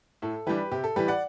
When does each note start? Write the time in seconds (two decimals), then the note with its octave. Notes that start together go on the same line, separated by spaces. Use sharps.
0.22 A2 A4
0.47 E3 G3 D4 G4 B4
0.72 C3 G4
0.84 A4
0.96 E3 G3 G4 B4
1.08 D5 F#5